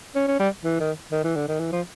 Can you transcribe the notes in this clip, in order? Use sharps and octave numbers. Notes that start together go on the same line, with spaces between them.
C#4
C#4
G3
E3
D#3
D#3
E3
D3
D#3
E3
F3